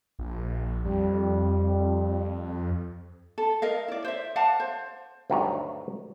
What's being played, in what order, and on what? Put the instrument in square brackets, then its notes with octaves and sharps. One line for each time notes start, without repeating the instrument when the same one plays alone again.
[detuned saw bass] A#1
[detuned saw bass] F2 [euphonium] G3
[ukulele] A4
A#4 D#5 F5
E4 D5
C5 E5
D5 F5 F#5 A5
C5
[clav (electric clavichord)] D2 G2 D#3 F#3 D4 A#5